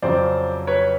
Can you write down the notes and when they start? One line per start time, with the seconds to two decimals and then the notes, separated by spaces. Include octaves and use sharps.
0.02 F2 C#3 F#3 C5 D5
0.67 B4 C#5